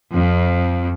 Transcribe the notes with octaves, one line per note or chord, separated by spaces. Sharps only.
F2